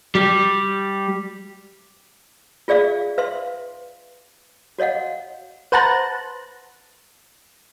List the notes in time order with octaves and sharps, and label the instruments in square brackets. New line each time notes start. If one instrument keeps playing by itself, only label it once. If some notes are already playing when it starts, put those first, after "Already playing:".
[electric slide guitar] G3
[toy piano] F4 G#4 D5 E5 F5
B4 E5 F5 C6
F#4 C#5 D#5 F5 F#5
[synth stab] B4 C5 F#5 A5 A#5 F#6